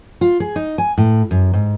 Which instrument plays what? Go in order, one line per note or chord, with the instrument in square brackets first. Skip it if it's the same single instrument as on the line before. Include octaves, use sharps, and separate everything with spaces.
[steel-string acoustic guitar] F4
G#4
D#4
G#5
A2
F#2
G#2